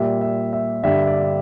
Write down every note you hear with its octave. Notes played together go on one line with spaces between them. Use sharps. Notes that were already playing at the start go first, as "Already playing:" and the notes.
Already playing: A#2 G3 E5
E5
E5
G2 D3 G3 E5
E5
D5